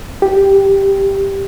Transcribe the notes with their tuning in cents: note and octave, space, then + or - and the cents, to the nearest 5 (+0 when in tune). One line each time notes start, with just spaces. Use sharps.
G4 +0